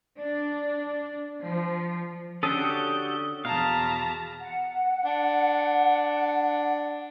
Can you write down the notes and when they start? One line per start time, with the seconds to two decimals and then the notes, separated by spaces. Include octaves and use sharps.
0.18 D4
1.42 F3
2.43 D3 C#4 F#4 G4 A4 D#6 G6
3.45 E2 B2 F5 A5 A#5
4.41 F#5
5.05 D4